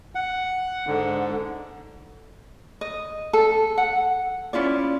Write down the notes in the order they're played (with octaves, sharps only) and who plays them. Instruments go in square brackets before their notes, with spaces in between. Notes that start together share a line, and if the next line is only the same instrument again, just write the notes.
[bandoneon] F#5
G#2 D3
[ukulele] D#5
A4
F#5
C#4 E4 F4 D5